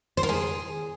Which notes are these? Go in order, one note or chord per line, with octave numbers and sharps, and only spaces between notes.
C5
A#4
G#4